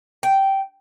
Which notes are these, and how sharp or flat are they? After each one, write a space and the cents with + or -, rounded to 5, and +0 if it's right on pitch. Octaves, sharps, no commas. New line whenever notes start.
G5 -10